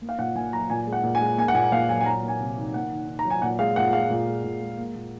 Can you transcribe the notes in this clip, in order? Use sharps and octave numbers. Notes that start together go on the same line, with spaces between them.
A#3
F5
A#2 F#5
A#2 G#5
F#3 A#5
A#2 G#5
G#3
F#5
A#2
G#5
G#3
A#3 G#5
F#5
A#2 G#5
A#2 F5
F#3 G#5
G#5
F#3 A#5
A#3
G#5
C3
D#3
A#3 F#5
D#3
D#3
A#5
F#3
G#5
A#2 F#5
G#3 F5
A#2 F#5
G#3 F5
A#2
G#3
A#2
G#3
A#3
A#2